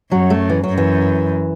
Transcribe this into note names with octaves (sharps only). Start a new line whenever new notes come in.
F#2 F#3
A3
E3
F#3
F#2
E3